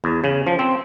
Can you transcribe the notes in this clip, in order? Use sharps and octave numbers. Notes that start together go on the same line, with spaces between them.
E2
C#3
F3
C4